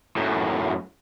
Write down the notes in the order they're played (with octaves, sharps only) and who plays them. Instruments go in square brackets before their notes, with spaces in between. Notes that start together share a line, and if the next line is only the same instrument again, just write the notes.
[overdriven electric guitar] F#2 A2